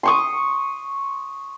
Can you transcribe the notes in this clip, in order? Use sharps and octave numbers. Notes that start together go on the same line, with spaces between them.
C6 C#6 D#6